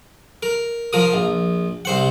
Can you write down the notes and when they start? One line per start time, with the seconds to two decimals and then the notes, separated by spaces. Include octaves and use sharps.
0.43 A#4
0.93 F3 A#4 D#6
1.14 A#1
1.85 C2 C5 F#5